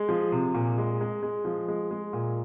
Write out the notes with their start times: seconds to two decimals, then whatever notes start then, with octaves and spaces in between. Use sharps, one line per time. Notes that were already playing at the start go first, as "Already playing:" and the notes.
Already playing: G#3 G#4
0.09 F3
0.32 C3
0.54 A#2
0.78 G#3
1.01 G#3
1.23 G#3
1.45 F3
1.68 G#3
1.91 G#3
2.13 A#2